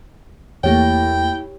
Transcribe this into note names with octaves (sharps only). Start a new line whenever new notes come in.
E2 A3 A#3 E4 G4 C#5 G5